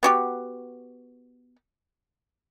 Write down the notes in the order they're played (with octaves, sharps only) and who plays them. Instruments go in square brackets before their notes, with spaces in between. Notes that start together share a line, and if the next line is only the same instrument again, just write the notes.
[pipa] B3 F#4 G4